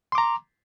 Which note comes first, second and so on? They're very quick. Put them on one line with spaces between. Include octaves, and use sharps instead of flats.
C6 D6 A#5